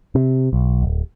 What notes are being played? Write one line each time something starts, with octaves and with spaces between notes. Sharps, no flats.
C3
B1
D1